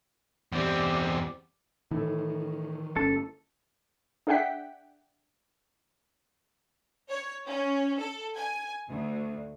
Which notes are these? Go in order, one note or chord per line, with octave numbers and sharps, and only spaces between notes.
E2 C4 G4 D5
A2 D#3 E3 A4
G1 C#4 A4
D4 G#4 E5 F#5 G5 B6
C#5
C#4
A4
G#5
D2